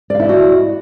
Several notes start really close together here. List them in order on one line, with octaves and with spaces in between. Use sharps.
D5 F5 E4 D#5 F#4